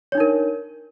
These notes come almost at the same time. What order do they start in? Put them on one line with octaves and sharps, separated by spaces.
C#5 D4 D#4 A#4